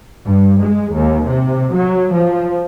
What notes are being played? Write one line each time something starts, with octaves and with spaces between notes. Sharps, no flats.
G2
G#3
D#2
C3
F#3
F3